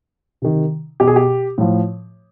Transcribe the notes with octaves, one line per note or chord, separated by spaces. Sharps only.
C3 D#3
B2 G4
G#4
G4
A2 F3